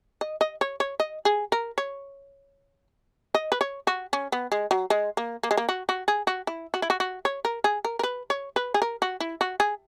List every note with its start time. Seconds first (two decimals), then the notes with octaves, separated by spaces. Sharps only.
0.21 D#5
0.41 D#5
0.61 C#5
0.80 C#5
1.00 D#5
1.25 G#4
1.52 A#4
1.78 C#5
3.35 D#5
3.52 B4
3.61 C#5
3.87 F#4
4.13 C#4
4.32 B3
4.52 G#3
4.71 F#3
4.90 G#3
5.17 A#3
5.43 A#3
5.51 G#3
5.57 A#3
5.69 F#4
5.89 F#4
6.08 G#4
6.27 F#4
6.47 E4
6.74 F#4
6.82 E4
6.90 F#4
7.00 F#4
7.25 C#5
7.45 A#4
7.64 G#4
7.85 A#4
7.99 A#4
8.03 B4
8.30 C#5
8.56 B4
8.74 G#4
8.82 A#4
9.02 F#4
9.20 E4
9.41 F#4
9.60 G#4